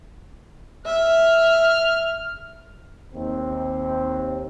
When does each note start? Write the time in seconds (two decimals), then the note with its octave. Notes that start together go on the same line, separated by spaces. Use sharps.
0.86 E5 F6
3.12 D#2 C4